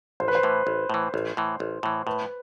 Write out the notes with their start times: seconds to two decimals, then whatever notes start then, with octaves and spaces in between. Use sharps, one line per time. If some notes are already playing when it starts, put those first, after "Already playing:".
0.20 A1 C5
0.28 B4
0.35 C5
0.43 A2 E3
0.67 A1
0.90 A2 E3
1.14 A1
1.37 A2 E3
1.60 A1
1.83 A2 E3
2.07 A2 B4